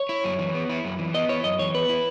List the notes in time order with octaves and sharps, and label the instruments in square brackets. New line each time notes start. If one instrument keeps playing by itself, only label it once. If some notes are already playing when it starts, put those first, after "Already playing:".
Already playing: [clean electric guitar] C#5
[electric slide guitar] E4
F#2
E3
B3
E4
F#2
E3
[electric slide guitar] B3 [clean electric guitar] D#5
[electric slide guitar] E4 [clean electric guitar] C#5
[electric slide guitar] F#2 [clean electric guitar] D#5
[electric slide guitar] E3 [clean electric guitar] C#5
[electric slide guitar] B3 [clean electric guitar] B4
[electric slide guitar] E4